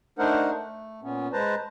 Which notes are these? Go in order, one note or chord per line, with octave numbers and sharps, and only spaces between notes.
A3 D4 D#4 A#4 C5 F#5
A3
A#2 B3 C#4
G#3 B4 C5 A5 A#5